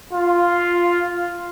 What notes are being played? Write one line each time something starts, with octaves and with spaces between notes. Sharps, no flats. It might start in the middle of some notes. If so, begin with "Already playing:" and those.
F4